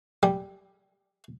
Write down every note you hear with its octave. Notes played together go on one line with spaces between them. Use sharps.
G3